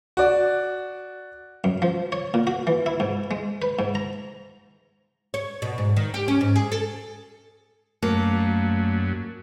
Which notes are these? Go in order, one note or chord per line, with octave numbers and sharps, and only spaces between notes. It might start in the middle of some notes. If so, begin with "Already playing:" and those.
F#4 D5
F#2
F3
C#5
A#2
F#4
E3
E4
G#2
G#3
B4
G#2
A#5
C#5
B2
G#2
D#3
G4
C#4
G#2
G#4
A4
F#2 A3 A#3